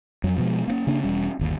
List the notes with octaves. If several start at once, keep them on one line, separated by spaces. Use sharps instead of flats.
F2 F#3
B2 F3 G#3
A#3 B3 C#4
C#3 A#3 D4
E1 G3 C#4
G1 D#2